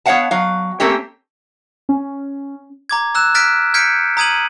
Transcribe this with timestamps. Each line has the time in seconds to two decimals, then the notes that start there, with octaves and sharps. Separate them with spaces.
0.06 B3 C#5 D5 F5 F#5 A5
0.31 F#3 F5
0.80 A3 A#3 C4 C#4 G4
1.89 C#4
2.89 A#5 D6 G#6
3.15 A#5 E6 F#6 E7
3.35 F6 F#6 A6 B6 D7
3.74 F6 G6 G#6 B6 C#7 D7
4.17 A#5 D#6 G#6 D#7 F#7